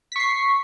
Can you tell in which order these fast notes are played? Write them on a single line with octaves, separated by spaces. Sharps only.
B6 C#6 C7